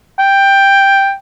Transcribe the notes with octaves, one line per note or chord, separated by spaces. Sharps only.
G5